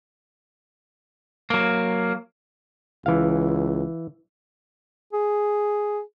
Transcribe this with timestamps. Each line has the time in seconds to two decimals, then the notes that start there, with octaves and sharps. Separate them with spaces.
1.50 F#3 A#3
3.06 C#2 E3 F5
5.13 G#4